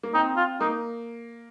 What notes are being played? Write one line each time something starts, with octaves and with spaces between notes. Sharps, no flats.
A#3
C4 D#4
F4
A#3 D#4